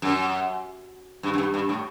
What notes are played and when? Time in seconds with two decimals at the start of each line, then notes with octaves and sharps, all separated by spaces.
0.02 F#2
1.23 G2
1.34 F#2
1.38 G2
1.54 G2
1.69 A2